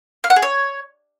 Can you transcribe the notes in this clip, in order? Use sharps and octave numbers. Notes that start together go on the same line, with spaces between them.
F5
F#5
G#4
C#5